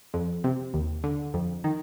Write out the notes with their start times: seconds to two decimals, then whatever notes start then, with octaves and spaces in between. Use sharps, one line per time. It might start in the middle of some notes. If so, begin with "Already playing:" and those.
0.14 F2
0.44 C3
0.74 D#2
1.04 D3
1.34 F2
1.64 D#3